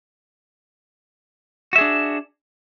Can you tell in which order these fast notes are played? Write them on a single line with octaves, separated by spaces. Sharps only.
F#4 E5 G#4 D4